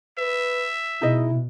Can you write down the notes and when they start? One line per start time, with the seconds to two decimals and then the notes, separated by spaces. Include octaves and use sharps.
0.18 B4 E5
1.02 B2 D#4 E4 G#4 D#5